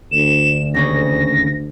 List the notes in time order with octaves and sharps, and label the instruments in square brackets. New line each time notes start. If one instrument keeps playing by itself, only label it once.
[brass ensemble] D2 [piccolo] E7
[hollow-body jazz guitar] D#2 C#3 C#4 [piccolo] A#6